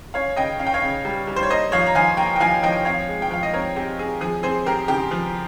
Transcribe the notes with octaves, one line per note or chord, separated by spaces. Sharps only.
C#4 C#5 F5
C#3 D#5 G5
C#4 F5
G5
C#5 F5
C#3
G3
G3
C5
C#5
A#3 C5 D#5
F3 C#5 F5
A#5
F3 F5 G#5
A#3 G5 A#5
G5
F3 F5 G#5
F3 D#5 G5
C4 C#5 F5
G#3
G5
F3 F5
D#5
C4 A#4 C#5
C4 G4
C4 G#4
F3 G#4
C4 G#4 C5
C4 G4 A#4
C#3 G4
F3